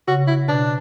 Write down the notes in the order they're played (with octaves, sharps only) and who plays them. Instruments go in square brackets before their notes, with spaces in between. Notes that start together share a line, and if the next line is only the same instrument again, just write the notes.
[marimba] C#3 [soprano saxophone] F#4
[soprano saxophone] E4
[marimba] B2 [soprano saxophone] D4